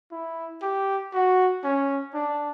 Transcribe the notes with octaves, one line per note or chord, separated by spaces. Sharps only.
E4
G4
F#4
C#4
D4